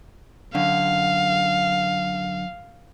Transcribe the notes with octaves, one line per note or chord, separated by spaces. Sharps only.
F#2 D3 F5